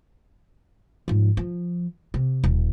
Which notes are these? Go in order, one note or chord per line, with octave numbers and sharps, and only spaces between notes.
G#2 F3
F3
C3
D#1